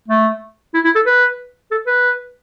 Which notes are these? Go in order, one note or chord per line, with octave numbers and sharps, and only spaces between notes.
A3
E4
E4
A4
B4
A4
B4